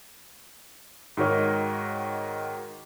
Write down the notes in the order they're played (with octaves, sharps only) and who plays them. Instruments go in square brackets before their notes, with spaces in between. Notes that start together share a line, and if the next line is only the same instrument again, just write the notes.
[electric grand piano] G#2 D#3 F#4 A#4 C#5 D#5